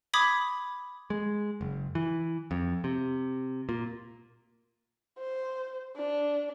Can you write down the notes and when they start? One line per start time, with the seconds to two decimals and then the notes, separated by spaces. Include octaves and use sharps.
0.14 B5 D6 D#6 G#6 B6
1.10 G#3
1.61 F#1
1.95 E3
2.51 F2
2.84 C3
3.69 A#2
5.18 C5
5.97 D4